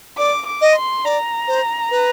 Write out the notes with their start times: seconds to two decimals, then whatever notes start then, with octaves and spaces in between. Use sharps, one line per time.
0.18 D5 D6
0.47 D6
0.61 D#5
0.76 C6
1.05 D5 A#5
1.48 C5
1.91 B4